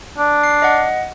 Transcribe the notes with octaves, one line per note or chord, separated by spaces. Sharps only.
D4
C7
D#5 F#5